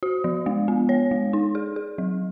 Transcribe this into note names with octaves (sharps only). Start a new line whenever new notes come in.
F#4
F3
G#3
B3
C#5
G#3
D#4
G#4
G#4
F#3